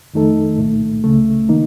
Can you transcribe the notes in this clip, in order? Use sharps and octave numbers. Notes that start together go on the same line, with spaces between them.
F2 D#3 A3 D#4 A4
C2 A#2 A3
C#2 C#3 A3
D#3 A#3 D#4